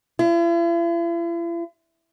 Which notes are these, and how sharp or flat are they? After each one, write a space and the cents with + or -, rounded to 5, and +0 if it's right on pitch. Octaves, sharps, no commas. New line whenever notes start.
E4 +45